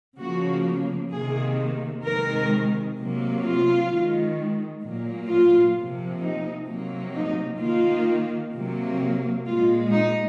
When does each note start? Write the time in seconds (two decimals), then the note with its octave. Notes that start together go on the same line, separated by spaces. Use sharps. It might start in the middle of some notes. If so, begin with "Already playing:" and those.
0.20 C#3 F3 A#3 F#4
1.12 C3 D#3 A#3 G#4
2.05 C3 D#3 G#3 A#4
2.98 C3 F#3 A#3
3.44 F4
3.90 D#3 G#3
4.83 A#2 F#3 A#3
5.29 F4
5.76 C3 F3 A#3
6.22 D#4
6.69 C3 F#3 A#3
7.15 D#4
7.61 D#3 A#3 F4
8.54 C3 F#3 A#3
9.46 A#2 G#3 F4
9.93 D#4